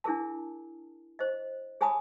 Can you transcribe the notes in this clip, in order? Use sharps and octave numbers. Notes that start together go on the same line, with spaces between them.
D4 E4 G#4 A#4 A5
C5 D#5
G#4 C#5 G#5 A5 B5 D#6